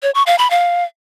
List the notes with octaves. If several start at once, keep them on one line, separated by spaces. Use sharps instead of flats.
C#5
C#6
F5
B5
F5